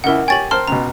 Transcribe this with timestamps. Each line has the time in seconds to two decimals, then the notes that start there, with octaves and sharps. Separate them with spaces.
0.04 C#2 E4 A#4 F#5
0.28 G4 C#5 G5 G#5 A6 F#7
0.51 A#4 C5 A5 C6 F6
0.68 C#2 B2 A#5